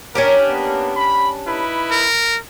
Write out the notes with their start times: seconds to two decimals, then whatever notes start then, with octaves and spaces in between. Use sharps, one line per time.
0.15 C#4 D4 G4 A#4
0.47 A#3 B3
0.96 B5
1.46 D#4 E4 B4
1.91 A#4